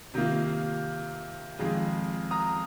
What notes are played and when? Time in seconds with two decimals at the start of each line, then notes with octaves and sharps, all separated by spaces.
0.14 C3 D#3 A#3 F4
1.59 F2 D#3 G#3 F4
2.31 A#5 D#6